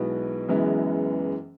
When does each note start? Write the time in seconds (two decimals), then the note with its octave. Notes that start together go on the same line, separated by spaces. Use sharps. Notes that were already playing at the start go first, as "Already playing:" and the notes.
Already playing: B1 B2 G#3 B3 E4
0.49 F#1 F#2 E3 G#3 B3